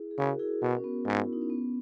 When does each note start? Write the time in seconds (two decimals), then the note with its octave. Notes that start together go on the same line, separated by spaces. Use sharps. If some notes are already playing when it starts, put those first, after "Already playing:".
Already playing: E4 G#4
0.11 G#4
0.18 C#3 F#4 A#4
0.34 A#4
0.39 E4 G#4
0.61 B2 F#4 A#4
0.77 C#4
0.84 B3
1.06 G#2
1.24 E4
1.33 D#4
1.41 C#4
1.50 B3